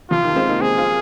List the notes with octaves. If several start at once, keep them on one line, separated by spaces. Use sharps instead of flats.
C3 F3 F4
D#3
G#3 C4
A#3 D#4
G#3 C4 G#4
C4 F4